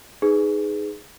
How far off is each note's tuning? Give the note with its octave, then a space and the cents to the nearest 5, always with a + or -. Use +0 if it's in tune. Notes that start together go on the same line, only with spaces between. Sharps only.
D#4 +0 G#4 +0 B4 +25